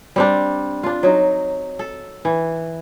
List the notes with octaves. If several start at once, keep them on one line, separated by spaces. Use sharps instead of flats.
G3 C4 D4
D4 F4
F#3 D#4
A4
E3